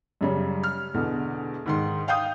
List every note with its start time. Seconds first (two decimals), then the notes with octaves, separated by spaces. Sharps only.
0.21 F#2 C#3 G3
0.63 F6
0.94 E2 B2 D3
1.66 G#2 D#3 C6
2.08 F5 G5 D#6 G6